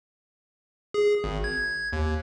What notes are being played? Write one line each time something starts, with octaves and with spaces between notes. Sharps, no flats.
G#4
G#1
G#6
D#2